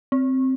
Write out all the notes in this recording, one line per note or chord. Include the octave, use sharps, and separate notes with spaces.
C4